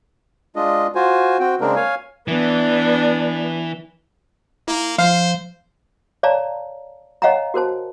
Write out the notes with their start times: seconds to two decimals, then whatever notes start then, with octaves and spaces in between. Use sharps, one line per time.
0.56 G#3 D4 F4 D#5
0.95 F4 F#4 C5 G#5
1.40 C4 F#4 G5
1.61 C#3 G#3 A#3 C4 D4 A#4
1.76 C#5 F5 G#5
2.28 E3 B3 D4
4.68 A#3 E4
4.98 F3 C5 F5
6.23 C#5 D5 F5 A5 A#5
7.22 C#5 D#5 F5 F#5 G#5 A#5
7.54 F#4 A#4 C5 A5